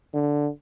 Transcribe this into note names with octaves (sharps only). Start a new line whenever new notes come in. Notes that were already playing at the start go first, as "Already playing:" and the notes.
D3